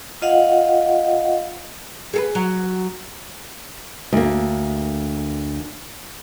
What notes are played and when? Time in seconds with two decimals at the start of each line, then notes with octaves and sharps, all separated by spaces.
0.22 F4 D#5 F5 F#5
2.13 G#4 A4 B4
2.35 F#3
4.13 D2 A#3